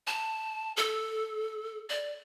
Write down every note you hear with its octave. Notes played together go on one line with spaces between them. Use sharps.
A5
A4
D5